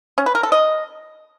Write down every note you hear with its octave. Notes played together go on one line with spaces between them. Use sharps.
C#4
B4
A#4
A4
D#5